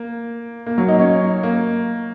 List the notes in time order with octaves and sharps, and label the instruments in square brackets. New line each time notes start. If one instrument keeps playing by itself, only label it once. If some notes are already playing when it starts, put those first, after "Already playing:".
Already playing: [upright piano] A#3
A#3
F#3
D#4
C#4
A#3